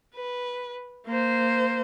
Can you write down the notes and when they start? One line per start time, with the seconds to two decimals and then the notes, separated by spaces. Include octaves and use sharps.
0.16 B4
1.06 A#3 C5